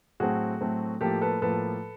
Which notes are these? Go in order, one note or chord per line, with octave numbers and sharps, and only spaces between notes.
A2 F#3 A3 C4 F#4 G#4
A2 F#3 A3 C4
A2 F3 A#3 G4 A4
A4 B4
A2 F3 A#3 A4 B4